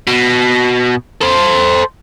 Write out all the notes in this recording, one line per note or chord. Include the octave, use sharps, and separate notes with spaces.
B2
A4 C5